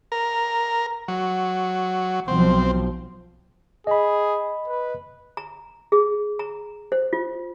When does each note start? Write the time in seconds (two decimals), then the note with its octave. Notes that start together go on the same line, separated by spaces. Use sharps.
0.12 A#4
1.08 F#3
2.28 B1 F3 C4
3.87 G#4 D#5 B5
4.68 B4
5.37 A#5
5.92 G#4
6.39 A#5
6.92 C5
7.13 F4